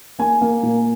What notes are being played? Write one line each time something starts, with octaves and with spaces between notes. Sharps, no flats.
A#3 G#5
A#3
A#2